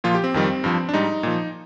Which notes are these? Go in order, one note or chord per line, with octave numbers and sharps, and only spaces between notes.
A#2 F3 F4
G4
C4
F2 D#3 G3
G2 F3
D4
G#2 G3 D#4
A#2 F3